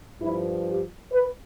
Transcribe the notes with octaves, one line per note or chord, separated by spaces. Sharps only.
G2 F3 E4
G4
B4